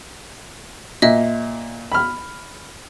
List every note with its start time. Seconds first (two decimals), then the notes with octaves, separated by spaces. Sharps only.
1.02 A#2 D#5 E5
1.92 B5 F6